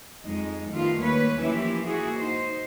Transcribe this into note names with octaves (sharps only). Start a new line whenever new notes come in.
F2 G#3 D#4
D#3 G3 A3 B3 F4
D#2 B4 C#5
E3 F3 A#3 C#4 E4 G4
A#3 E4 F#4 G#4
D#4 C5